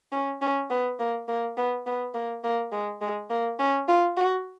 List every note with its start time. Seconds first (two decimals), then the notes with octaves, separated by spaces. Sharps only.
0.12 C#4
0.41 C#4
0.70 B3
0.99 A#3
1.28 A#3
1.57 B3
1.86 B3
2.14 A#3
2.44 A#3
2.72 G#3
3.01 G#3
3.30 A#3
3.59 C#4
3.88 F4
4.17 F#4